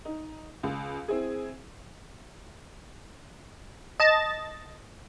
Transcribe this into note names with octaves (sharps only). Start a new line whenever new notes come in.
D#4
C#2
C4 E4 G#4
D#5 A5 A6